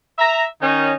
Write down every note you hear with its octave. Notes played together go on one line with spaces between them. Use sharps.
E5 A#5
D#3 C#4 D#4